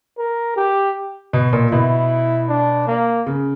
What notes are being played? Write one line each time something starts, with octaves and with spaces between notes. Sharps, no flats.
A#4
G4
B2
A#2
B2 E4
D4
A#3
C#3